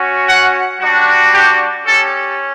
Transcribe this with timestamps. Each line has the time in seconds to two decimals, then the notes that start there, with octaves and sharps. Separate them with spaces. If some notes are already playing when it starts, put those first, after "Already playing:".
Already playing: C#4 F#4
0.29 F#5
0.81 G3 D4 F#4
1.34 G4
1.86 C#4 G4 A4